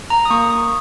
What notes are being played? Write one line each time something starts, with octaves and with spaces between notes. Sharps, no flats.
A#5
D#6
A#3 C#6
D#6